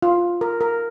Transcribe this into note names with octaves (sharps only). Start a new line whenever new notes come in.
F4
A#4
A#4